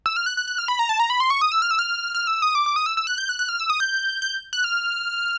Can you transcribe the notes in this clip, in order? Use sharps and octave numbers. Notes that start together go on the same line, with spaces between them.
E6
F6
F#6
F#6
F#6
F6
B5
A#5
A5
A#5
B5
C6
C#6
D#6
E6
F6
E6
F6
F6
E6
D#6
D6
D6
D#6
E6
E6
F#6
G6
F#6
F#6
F6
E6
D#6
G6
G6
F#6
F6